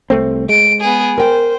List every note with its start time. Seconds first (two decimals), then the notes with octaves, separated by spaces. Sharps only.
0.10 C2 A3 C4
0.49 G#3 D7
0.81 B3 G#4
1.18 A#4 C5 G5